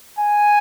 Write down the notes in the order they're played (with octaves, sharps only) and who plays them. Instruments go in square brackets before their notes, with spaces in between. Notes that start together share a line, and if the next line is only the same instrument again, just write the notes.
[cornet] G#5